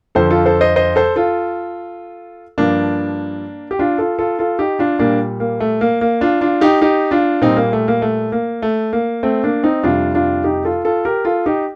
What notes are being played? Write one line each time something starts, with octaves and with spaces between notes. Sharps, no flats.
F2 D3 F3 A4 C5
F4 A4
A4 C5
C5 D#5
C5 D#5
A4 C5
F4 A4
G2 F3 A#3 D4
G4
D4 F4
F4 A4
F4 A4
F4 A4
D#4 G4
D4 F4
A#2 G3 A#3 D4
A#3
A3
A#3
A#3
D4 F4
D4 F4
D#4 G4
D#4 G4
D4 F4
A#2 G3 C4 D#4
A#3
A3
A#3
A3
A#3
A3
A#3
A3 C4
A#3 D4
C4 D#4
F2 C3 G3 D4 F4
D4 F4
D#4 G4
F4 A4
F4 A4
G4 A#4
F4 A4
D#4 G4